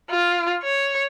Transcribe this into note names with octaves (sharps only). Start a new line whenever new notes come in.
F4
C#5